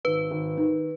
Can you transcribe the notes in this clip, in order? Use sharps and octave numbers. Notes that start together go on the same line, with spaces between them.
G#1 B4
G#1
D#3